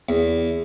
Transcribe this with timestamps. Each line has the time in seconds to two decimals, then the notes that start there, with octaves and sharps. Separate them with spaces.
0.09 E2